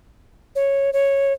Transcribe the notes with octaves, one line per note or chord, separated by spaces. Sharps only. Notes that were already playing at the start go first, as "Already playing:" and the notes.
C#5
C#5